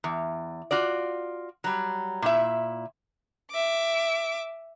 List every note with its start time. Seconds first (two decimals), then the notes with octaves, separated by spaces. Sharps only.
0.04 E2
0.71 F4 F#4 D5
1.64 F#3 G3
2.22 A#2 E4 E5
3.51 E5 D6